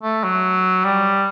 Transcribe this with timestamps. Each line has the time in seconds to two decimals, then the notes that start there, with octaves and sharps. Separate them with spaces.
0.03 A3
0.24 F#3
0.85 G3